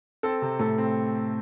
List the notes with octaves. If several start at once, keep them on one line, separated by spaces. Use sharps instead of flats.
C4 A4
C3
A2 A4
C4